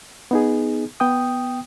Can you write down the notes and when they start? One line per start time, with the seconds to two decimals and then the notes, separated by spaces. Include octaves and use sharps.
0.31 B3 D#4 G#4
1.00 B3 G5 D#6